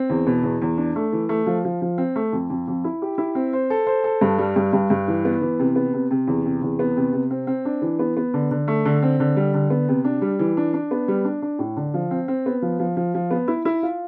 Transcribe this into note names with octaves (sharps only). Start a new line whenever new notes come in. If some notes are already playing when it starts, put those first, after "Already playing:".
Already playing: C4
E2
B2
E2
E2
D4
A3
E3
A3
F3
F3
F3
C4
A3
F2
F2
F2
E4
G4
E4
C4
C5
A4
C5
A4
G2
G3
G2
G2
G2
E3
B3
E3
C3
B3
C3
C3
E2
C3
E2
B3
C3
C3
C4
C4
D4
E3
B3
B3
D3
D3
A3
D3
C4
D3
G3
D3
B3
C3
D4
G3
E3
D4
D4
B3
G3
D4
D4
A2
D3
F3
C4
C4
B3
F3
F3
F3
F3
B3
E4
E4
F4